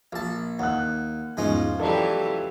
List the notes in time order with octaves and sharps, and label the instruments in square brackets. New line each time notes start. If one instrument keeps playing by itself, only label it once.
[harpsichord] A#1 A5
[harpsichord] D#2 [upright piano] F#5 F#6
[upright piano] E2 G#2 [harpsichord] F3 G#3 C#4
[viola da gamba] E3 F#3 G4 [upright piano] A4 D5 A#5